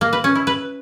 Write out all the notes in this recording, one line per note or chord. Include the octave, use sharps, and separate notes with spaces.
A#3
B4
C#4
E4
B4